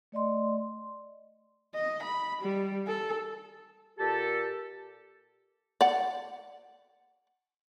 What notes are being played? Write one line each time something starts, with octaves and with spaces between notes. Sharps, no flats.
A3 D5 D#5 C6
D#5
B5
G3
A4
A#2 G4 A4
D5 F#5